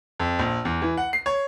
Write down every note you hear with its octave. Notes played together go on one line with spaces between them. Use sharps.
F2
A#1
E2
E3
F#5
C7
C#5